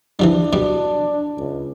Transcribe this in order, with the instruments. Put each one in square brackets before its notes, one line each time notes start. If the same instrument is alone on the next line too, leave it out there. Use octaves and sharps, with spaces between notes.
[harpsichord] E3 F3 G3 [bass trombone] D4
[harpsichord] B2 G3
[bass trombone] C#2